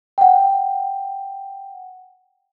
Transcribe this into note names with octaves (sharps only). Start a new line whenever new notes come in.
F#5 G5